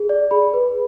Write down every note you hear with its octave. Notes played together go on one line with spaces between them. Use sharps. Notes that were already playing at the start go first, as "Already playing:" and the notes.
Already playing: G#4
D5
G#4 B5
B4